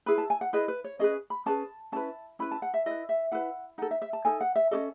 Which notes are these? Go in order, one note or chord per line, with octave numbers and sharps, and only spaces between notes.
E4 G#4 B4 B5
A5
G#5
F#5
E4 G#4 B4 D#5
B4
C#5
C#4 G#4 B4 D#5
B5
C#4 G#4 B4 A5
C#4 E4 B4 A5
C#4 E4 B4 B5
A5
F#5
E5
E4 B4 D#5
E5
E4 B4 F#5
D#4 A4 F#5
E5
E5
A5
D#4 A4 G#5
F#5
E5
C#4 F#4 A4 D#5